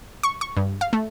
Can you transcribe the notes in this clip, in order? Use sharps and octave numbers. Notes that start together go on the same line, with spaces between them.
C#6
C#6
G2
F5
A3